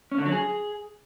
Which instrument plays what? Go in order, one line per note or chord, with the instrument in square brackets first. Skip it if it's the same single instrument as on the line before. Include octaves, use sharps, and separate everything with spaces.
[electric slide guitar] C#4
D3
F#3
G#4